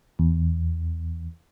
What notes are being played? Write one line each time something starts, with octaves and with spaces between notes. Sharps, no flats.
E2